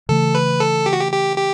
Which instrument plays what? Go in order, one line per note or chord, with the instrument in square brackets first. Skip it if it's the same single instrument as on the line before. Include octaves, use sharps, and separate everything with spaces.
[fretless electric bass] C#3 E3 A3 [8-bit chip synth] A4
[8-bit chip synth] B4
A4
G4
F#4
G4
G4
G4